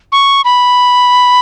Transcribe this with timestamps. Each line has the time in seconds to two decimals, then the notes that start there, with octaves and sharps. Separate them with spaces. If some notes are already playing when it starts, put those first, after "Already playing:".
0.12 C#6
0.45 B5